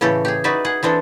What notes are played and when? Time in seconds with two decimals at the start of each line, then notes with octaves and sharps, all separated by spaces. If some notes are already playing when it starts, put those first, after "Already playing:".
0.01 A2 C#3 E3 G4 A4
0.25 G4 G#4
0.44 D#4 F#4 B4 D5 E5
0.65 G#4 F#5
0.83 E3 C4 D4 A4